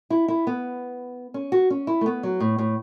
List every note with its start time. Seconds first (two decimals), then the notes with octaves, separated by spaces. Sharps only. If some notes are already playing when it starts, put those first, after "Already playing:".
0.10 E4
0.28 E4
0.47 B3
1.34 C#4
1.52 F#4
1.70 C#4
1.87 E4
2.01 A3
2.06 B3
2.23 F#3
2.40 A2
2.58 A2